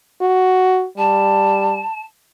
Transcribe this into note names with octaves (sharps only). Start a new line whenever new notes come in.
F#4
G3 A5